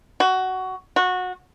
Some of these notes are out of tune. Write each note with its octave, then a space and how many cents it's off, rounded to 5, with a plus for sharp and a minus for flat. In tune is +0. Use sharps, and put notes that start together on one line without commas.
F#4 +15
F#4 -20